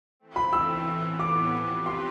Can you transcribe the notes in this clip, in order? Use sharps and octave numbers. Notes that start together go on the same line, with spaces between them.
E3 A3 C4
B5
E6
A2 E3 B3
D6
F3 C4 G4 B4
C6